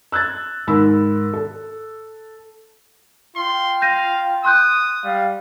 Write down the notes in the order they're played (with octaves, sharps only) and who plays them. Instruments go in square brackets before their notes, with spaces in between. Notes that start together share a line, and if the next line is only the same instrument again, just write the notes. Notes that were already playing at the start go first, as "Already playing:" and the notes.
[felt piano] E6 F#6 G#6 A6
G#2 D#3 A#4 B5 E6
A4
[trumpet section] F4 G5 [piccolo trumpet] C6
[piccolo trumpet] F5 [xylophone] G6 A#6 D#7
[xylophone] C6 F#6 G6 [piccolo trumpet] D#6
[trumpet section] G3 F5